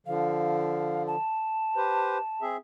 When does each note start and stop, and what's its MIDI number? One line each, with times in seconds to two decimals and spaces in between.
0.07 1.16 50
0.07 1.16 53
0.07 1.03 77
1.07 2.44 81
1.76 2.18 67
1.76 2.18 71
1.76 2.18 72
2.42 2.57 60
2.42 2.57 68
2.42 2.57 76